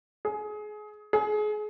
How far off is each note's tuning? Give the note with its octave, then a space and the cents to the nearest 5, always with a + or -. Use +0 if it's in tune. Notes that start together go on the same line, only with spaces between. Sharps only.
G#4 +25
G#4 +30